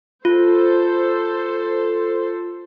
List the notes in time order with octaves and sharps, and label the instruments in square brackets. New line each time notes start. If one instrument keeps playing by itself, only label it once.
[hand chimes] F4 [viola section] A4 C5